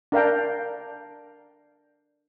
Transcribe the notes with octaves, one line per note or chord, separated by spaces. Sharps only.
D4 A#4 F5 G5